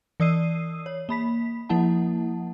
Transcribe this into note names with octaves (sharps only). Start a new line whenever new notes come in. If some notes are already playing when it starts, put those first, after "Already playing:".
E3 D5 D#6 E6 C7 D#7
C#5
A#3 B5 B6
F3 A#3 E4 F#5 A5